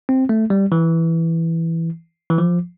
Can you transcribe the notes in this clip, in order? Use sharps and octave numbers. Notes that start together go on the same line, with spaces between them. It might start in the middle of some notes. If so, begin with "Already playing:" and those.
C4
A3
G3
E3
E3
F3